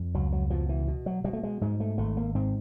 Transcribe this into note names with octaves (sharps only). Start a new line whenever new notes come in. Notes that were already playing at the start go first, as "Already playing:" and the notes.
Already playing: F2
C#2 F#3
F#3
B2 F3
E3
B2
F#3
B2 G3
A3
G#3
G#2 G#3
A3
G#1 A3
A#3
G#2 C4